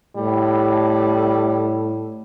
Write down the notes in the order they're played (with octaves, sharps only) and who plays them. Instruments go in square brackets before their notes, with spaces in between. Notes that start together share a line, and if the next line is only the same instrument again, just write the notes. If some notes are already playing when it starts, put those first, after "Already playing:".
[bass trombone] A2 [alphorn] G3